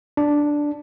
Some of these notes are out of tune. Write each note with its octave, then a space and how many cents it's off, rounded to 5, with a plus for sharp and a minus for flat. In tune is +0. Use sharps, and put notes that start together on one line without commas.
D4 +0